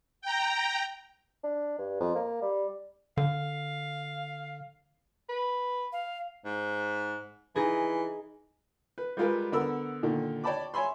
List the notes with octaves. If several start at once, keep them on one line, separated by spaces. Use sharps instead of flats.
G5 A#5
D4
G2
F2
A#3
G3
D3 F5
B4
F5
G#2
E3 D#4 G#4
B4
G3 G#3 F4 A#4 B4
D3 B3 A#4 B5 E6
A#2 D3 D#3
C#5 D5 G5 A5 B5 D6
C#5 E5 G#5 B5 C6